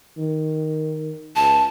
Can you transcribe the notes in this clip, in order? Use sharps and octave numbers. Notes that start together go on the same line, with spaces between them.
D#3
C#2 A5